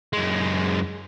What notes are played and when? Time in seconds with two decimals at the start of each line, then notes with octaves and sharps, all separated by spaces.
0.13 F#2 G#3